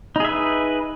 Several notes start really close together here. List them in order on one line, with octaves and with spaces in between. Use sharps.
D#4 G#4 E5 B4